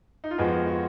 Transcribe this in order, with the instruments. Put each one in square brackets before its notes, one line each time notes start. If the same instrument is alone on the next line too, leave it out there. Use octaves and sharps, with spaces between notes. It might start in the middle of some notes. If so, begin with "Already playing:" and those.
[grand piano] D#4
F4
F2 F3 G#3 B3 F#4
F#4